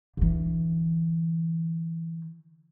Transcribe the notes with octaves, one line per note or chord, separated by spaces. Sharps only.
D3 E3